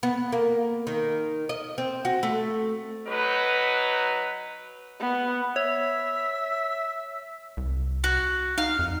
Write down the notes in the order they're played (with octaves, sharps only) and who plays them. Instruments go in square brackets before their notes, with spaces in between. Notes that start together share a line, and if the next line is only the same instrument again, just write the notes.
[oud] B3
A#3
D#3
D#5
C4
F#4
A3
[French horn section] F#3 D#4 B4
[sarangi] B3
[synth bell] C#5 [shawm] E5
[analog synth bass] C2
[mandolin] F#4
[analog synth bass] D#4 [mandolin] F5
[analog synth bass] F2